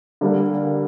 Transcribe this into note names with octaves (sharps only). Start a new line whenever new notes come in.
D3 G3 A#3 D5